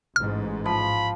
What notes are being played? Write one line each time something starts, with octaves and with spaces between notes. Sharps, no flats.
A1 G#2 F6
F3 B5